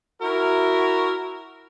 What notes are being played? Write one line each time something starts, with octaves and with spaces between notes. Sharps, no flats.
E4 F#4 A#4